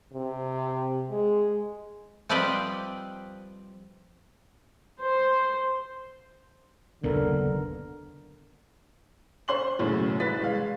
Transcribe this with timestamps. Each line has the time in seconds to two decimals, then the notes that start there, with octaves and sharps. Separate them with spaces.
0.14 C3
1.11 G#3
2.29 F3 G3 C4 B4 D5 D#5
5.00 C5
7.04 F#1 D#2 A#2 D3 B3 A#4
9.48 C5 C6 F#7
9.79 B1 F#2 A2 C#3 E3
10.20 C2 B4 A6 B6
10.39 E2 G#3 F5